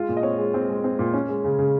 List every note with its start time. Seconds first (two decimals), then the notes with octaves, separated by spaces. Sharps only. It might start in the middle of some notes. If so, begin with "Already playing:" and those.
Already playing: G#3 F4
0.09 A#2
0.17 D#5
0.23 C4 C#5
0.38 G#3
0.54 C4
0.69 G#3
0.84 C4
0.99 A#2
1.13 C#4
1.28 G#3
1.44 C#3
1.59 C#3